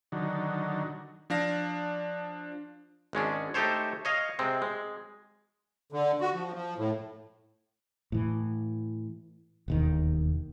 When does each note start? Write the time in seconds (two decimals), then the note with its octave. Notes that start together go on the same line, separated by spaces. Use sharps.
0.12 D3 D#3 F#3
1.30 F3 D4 F5 A#6
3.13 G#1 G#3 C#4 D4
3.54 A3 D#4 G4 A4 C5 C#5
4.05 C#5 D#5 F5
4.39 C3 G#3 C4
4.62 G#3
5.92 D3
6.21 F#4
6.34 F3
6.53 F3
6.78 A2
8.12 A2 E3
9.68 E1 D#2 D#3